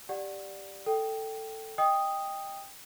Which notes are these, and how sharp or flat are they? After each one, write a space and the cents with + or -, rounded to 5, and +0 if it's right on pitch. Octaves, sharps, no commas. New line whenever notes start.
G4 +0 D5 +0 F#5 +0
A4 +5 G5 -10
D#5 +0 G5 +10 D#6 +0